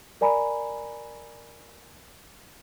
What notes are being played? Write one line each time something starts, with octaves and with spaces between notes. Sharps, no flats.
A#4 D5 G#5 A#5 B5